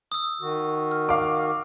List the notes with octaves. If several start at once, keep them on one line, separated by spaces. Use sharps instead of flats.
D#6 E6
D#3 F#4
F6
F5 D6